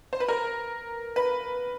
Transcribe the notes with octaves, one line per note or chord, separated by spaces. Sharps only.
C5
B4
A#4
B4